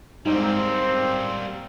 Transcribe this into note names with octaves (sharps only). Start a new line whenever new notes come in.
G#2 G3 A#3 C4